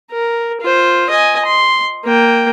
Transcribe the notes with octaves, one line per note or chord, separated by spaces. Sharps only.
A#4
F4 C5
D#5 G#5
C6
A#3 G5